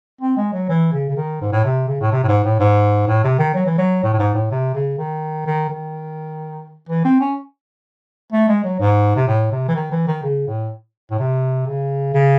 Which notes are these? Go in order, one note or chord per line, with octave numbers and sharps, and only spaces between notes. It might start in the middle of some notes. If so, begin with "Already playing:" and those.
C4
G#3
F#3
E3
C#3
C#3
D#3
G#2
A2
C3
C#3
A2
C3
A2
G#2
A2
G#2
A2
C3
D#3
F#3
E3
F#3
A2
A2
G#2
A2
C3
C#3
D#3
D#3
D#3
E3
C4
C#4
A3
G#3
F#3
G#2
C3
A2
C3
E3
D#3
E3
D#3
C#3
A2
A2
C3
C#3
C#3